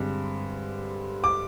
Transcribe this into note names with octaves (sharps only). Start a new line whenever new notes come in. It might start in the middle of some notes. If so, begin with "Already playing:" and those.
Already playing: G2 D3 G#3 C4
D6